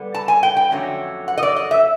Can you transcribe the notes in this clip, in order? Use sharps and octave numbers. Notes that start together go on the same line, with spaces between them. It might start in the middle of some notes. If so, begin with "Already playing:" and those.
Already playing: D3 G3 B3
A5
G#5
G5
G5
F2 D3 F#3 A3 C#4
F#5
D#5
D5
D#5
E5